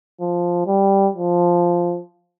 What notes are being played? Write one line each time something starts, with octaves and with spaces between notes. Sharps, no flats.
F3
G3
F3